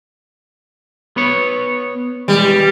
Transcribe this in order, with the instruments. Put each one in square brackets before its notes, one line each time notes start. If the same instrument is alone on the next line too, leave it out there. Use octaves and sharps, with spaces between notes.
[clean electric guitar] B3 B4 C#5
[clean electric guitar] E3 G#3 [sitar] G3